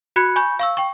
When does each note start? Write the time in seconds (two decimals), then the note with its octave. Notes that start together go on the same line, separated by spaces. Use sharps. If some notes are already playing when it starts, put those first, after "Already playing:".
0.16 F#4 B5 F#6 G#6 C#7
0.36 G#5 B5 C#6 G6
0.59 F5 C#6 E6
0.77 G5 C#6